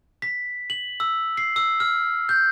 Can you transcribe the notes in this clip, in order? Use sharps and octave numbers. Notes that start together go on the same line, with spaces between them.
B6
F#7
E6
C7
E6
F6
G6